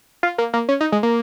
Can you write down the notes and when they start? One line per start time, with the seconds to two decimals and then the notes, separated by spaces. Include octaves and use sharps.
0.23 F4
0.38 A#3
0.53 A#3
0.69 C#4
0.81 D#4
0.92 G#3
1.03 A#3